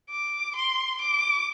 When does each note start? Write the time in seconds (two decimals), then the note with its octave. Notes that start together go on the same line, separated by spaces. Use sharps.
0.10 D6
0.56 C6
1.01 D6